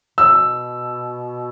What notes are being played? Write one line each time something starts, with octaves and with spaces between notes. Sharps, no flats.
B2 E6